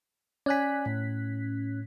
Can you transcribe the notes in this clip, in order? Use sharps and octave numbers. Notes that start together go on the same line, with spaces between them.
C#4 D5 G#5 F#6 B6
A2